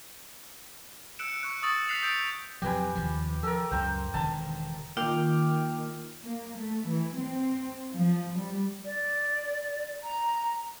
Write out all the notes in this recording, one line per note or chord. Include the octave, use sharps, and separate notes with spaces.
E6 F#6 C#7 D7 E7
C#6 F#6 D7
C#6 D#6 E6 A6 F#7
F#6 B6 C7 F7 F#7
D#6 E6 G6 A6 D7 F7
F2 C3 F#3 G4 B4 G#5
D#2 C3 F3
F3 A4 A#4
C#2 F#2 C5 G5 A#5
E1 D3 D#3 A5 A#5
D#3 A#3 F4 G5 D6 F6
A#3
A3
E3
C4
F3
G3
D5
A#5